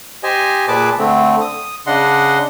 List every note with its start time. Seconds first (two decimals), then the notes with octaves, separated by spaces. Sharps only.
0.23 G4 C5 D#5 G#5
0.68 A#2 G#4 B4 A5 D6
0.99 D3 A3 C4
1.41 D#6
1.87 C#3 D4 D#5 F#5 C6